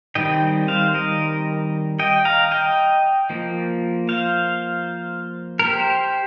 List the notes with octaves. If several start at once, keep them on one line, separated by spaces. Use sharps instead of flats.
D#3 G3 C4 D#5 G5
C5 F5
A#4 D#5
D#5 G5
F5 A#5
D#5 G5
F3 A#3
C5 F5
A#4
G4 C5